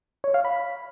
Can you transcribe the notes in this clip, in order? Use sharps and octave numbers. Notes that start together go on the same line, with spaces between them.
C#5
F5
B5